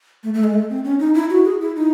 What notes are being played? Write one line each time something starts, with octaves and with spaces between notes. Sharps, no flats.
A3
A3
G#3
A3
C4
C#4
D#4
E4
F#4
G#4
E4
D#4